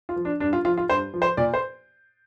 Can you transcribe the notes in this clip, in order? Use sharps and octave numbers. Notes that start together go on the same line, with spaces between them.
F4
F3
D4
G2 D4
F4
F3 F4
F4
G2 C5
F3
C5
A#2 D5
C5